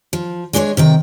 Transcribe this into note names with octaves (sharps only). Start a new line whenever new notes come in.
F3
G#3 D4 G#4 C5 C#5
C3 D#3 G5